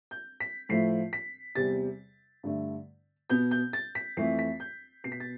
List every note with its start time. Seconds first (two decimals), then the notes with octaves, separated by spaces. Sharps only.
0.11 G6
0.40 B6
0.69 A2 F3 A3 C7
1.13 B6
1.55 E2 C3 G3 A6
2.43 G2 D3 A3
3.30 B2 B3 G6
3.51 G6
3.73 A6
3.95 B6
4.17 F2 E3 A3 C7
4.39 B6
4.60 G6
5.04 B2 B3 C7
5.12 B6
5.20 A6